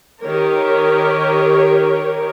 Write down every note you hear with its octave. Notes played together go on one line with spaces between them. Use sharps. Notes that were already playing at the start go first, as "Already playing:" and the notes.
D#3 G4 A#4 C#5